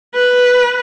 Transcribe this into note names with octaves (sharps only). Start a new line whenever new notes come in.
B4